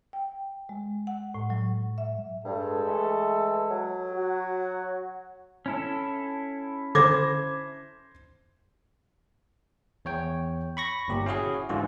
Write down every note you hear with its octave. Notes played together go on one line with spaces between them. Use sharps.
G5
G#3
F#5
A2
F#3
E5
G2 G#3 A4
E3 A3
F#3
F#4
C#4 E4 A4
D3 C5 D6 G#6 A#6
E2 C#5 G5
B5 C#6 A#6
G1 A#2 G4
C#4 E4 F#4 G#4
G#2 D3 E3 F4 F#4